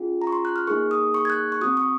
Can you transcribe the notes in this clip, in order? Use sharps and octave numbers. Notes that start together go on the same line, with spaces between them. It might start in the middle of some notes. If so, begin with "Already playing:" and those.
Already playing: C#4 F4 G#4
A#5
C#6
C6
F#6
F6
A#3 D#4 G#4 C#6
D#6
C#6
G#6
F#6
C#6
C4 F#4 D#6
C#6